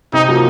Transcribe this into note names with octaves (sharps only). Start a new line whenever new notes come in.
C3 D#4
F3 A#3 C#4 F#4